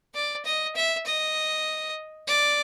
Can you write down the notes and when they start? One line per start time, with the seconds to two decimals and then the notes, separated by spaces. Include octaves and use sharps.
0.14 D5
0.45 D#5
0.76 E5
1.06 D#5
2.28 D5